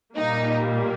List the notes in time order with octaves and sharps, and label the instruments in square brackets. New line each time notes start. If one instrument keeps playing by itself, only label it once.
[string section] A#2 G3 A#3 D#4